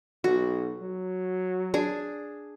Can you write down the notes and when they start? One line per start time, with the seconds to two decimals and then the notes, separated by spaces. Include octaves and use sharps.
0.24 B1 F#4
0.82 F#3
1.74 D4 G#4